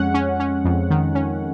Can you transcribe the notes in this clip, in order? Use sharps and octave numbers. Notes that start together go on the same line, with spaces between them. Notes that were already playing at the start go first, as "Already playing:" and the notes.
Already playing: F2 G#3 C#4 F#5
C#4
C#4
F2
D#3
C#4